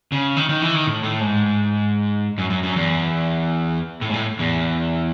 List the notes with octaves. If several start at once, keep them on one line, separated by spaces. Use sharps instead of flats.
C#3
D#3
D#3
E3
D#3
A2
A2
G#2
F#2
F#2
F#2
E2
A2
G#2
A2
E2